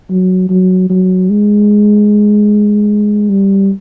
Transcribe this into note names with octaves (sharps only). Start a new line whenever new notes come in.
F#3
F#3
F#3
G#3
G3